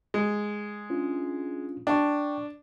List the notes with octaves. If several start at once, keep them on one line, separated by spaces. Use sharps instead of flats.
G#3
C#4 D4 F4
D4 G5 A5 C#6